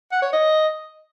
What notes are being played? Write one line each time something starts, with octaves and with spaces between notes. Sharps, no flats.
F#5
C#5
D#5